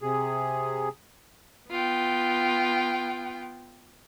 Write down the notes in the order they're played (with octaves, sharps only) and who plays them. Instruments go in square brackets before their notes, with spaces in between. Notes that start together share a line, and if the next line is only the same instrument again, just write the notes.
[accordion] C3 G#4
[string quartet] B3 F4 G5